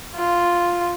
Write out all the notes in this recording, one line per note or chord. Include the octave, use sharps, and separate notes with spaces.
F4